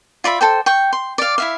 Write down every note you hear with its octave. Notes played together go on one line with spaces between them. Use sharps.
F4 D5 E5 B5
A4 C5 G5
G5 C#6
C6
D5 F5
E4 E5 F5